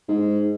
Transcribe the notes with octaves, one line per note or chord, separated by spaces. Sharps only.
G#2